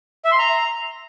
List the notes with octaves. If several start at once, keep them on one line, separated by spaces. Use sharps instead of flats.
E5
C6
A#5